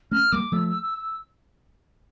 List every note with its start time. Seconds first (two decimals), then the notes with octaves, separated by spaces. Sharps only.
0.11 A3 C#4 F6
0.32 G3 A#3 D6
0.52 F3 A3 E6
0.68 E6
0.83 E6
0.98 E6